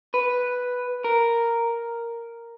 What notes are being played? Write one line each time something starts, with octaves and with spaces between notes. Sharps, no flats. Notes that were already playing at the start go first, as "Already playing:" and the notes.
B4
A#4